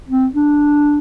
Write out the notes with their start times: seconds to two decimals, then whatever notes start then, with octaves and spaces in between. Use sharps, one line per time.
0.09 C4
0.35 D4